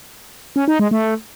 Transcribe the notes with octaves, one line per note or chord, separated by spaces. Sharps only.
C#4
D#4
G#3
A3